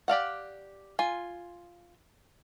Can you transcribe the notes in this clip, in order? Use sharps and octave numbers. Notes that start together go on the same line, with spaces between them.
G4 D5 F5 F#5
F4 G#5